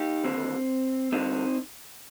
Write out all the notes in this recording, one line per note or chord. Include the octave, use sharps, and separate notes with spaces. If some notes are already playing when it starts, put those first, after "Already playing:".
Already playing: D#4 G4
D#2 D3 C4
G2 D3 C4 D#4